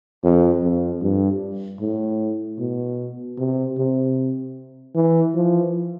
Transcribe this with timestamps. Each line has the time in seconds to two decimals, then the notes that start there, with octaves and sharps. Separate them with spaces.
0.24 F2
0.63 F2
1.02 G2
1.81 A2
2.59 B2
3.38 C3
3.78 C3
4.95 E3
5.35 F3